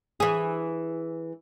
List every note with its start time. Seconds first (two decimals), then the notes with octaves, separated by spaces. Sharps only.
0.20 E3 G#4